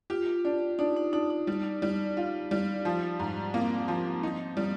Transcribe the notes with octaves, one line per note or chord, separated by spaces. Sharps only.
F4 G4
D4
D4 D#4
D#4
D4 D#4
D#4
G3 D#4
G3
F4
G3
F3
G#2
A#3 C4
F3
D#4
G3